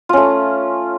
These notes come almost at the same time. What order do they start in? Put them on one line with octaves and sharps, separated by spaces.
F4 C#4 A3